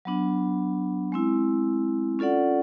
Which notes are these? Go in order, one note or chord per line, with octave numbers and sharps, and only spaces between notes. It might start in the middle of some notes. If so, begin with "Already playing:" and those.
F#3 B3 D4
G#3 C4 E4
C#4 F4 A4 D5 F#5